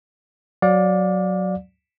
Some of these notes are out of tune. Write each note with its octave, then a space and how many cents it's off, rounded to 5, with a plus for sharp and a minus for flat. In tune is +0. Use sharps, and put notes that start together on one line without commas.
F#3 +0 D5 +0 F5 +40